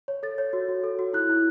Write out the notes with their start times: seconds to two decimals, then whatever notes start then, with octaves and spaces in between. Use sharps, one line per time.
0.08 C#5
0.23 A4 A6
0.38 C#5
0.53 F#4
0.69 F#4
0.84 A4
0.99 F#4
1.13 E4 F#6
1.29 E4